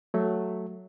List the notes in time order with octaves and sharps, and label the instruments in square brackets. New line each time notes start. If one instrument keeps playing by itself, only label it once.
[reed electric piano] F#3 A3